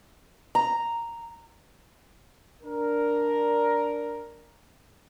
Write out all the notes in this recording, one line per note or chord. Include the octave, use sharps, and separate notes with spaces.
A#5
D4 A#4